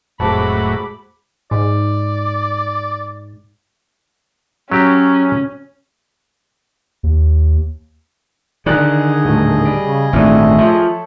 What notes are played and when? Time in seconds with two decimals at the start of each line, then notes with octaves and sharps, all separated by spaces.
0.20 F1 A2 F#3 G#3 C5 A5 B5 D6
1.51 G#2 D5
4.71 F#3 C#4 G4
7.03 D#2
8.66 D3 D#3 G#4 D5 D#5 F#6 A6
9.24 D#1 A2
9.65 G3 D7
9.82 C#3
10.13 G#1 A#2 E3 A3 C4 D4 D5
10.59 F3 A4 C#5 E5